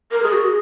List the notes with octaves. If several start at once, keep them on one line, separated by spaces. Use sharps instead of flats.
A#4
G#4
F#4
G#4